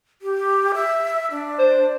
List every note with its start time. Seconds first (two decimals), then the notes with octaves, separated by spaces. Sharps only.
0.22 G4
0.74 E5
1.31 D4
1.59 C5